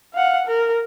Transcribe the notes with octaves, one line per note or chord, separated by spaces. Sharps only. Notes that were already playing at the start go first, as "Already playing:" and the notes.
F5 F#5
A#4